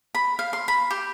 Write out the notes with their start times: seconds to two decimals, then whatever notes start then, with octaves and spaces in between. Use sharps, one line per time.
0.15 B5
0.39 F5
0.53 C6
0.68 B5
0.91 G4